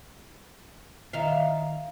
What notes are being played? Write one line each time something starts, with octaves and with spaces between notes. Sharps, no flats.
D#3 E5 F5